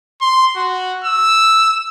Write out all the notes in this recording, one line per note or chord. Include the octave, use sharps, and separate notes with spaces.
C6
F#4
E6